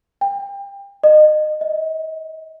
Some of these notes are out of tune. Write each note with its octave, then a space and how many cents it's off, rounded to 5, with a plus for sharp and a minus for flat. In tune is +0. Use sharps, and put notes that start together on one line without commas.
G5 +30
D#5 -30
D#5 +40